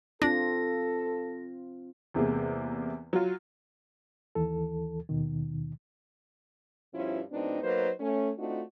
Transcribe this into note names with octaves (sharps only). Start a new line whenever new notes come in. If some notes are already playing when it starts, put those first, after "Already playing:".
C4 D4 F4 A4 A#6
E2 C3 G#3 A#3
F#3 F4
D#2 E3 A4
D#2 B2 D#3
G2 B2 F3 C#4 E4 F4
A2 F#3 B3 C4 D4 D#4
F#3 A#3 B3 D#4 B4 C5
A3 C#4
A3 C4 D4 D#4 F4 F#4